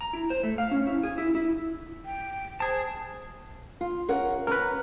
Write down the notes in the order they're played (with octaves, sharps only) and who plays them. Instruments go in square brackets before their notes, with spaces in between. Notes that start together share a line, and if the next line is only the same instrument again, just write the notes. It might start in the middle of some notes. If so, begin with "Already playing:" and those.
[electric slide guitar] A#5
E4
C5
A3
F5
C#4
E4
G#4
E4
E4
[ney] G5
[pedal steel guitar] G#4 A5 [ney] C5
[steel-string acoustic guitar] F4
C#4 A#4 F#5
[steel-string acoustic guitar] C#4 [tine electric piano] A#4 B4